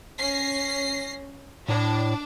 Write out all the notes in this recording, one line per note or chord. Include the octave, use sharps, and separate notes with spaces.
C#4 A#6 C7
A2 D4